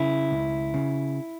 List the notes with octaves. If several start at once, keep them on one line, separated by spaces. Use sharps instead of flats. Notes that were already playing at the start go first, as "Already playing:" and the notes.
Already playing: C#3 E4
C#2
C#3